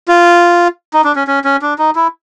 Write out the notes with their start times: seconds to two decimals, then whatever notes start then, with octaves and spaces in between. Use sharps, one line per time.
0.08 F4
0.94 D#4
1.04 D4
1.16 C#4
1.27 C#4
1.45 C#4
1.62 D4
1.79 D#4
1.96 E4